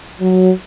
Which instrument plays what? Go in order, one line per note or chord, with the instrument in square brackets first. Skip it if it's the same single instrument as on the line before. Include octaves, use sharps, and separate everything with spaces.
[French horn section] F#3